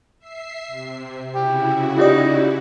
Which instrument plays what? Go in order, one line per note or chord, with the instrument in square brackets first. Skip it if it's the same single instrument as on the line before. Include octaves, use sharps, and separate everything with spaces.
[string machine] E5 C7
C3
[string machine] C#3 E4 F#4 [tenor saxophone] G4
[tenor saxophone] D#4 [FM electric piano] F4 G4 D5